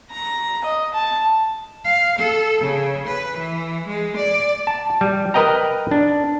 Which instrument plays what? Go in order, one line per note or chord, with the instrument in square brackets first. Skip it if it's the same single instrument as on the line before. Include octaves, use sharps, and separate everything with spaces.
[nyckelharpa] A#5
D#5
A5
[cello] F5
A4
C#3
B4
E3
G#3
D5
[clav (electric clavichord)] A5
G3
A#4 B4 D#5 G5 A#5
D4